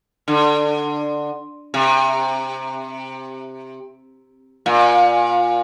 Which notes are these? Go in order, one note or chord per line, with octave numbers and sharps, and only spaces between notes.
D3
C3
A#2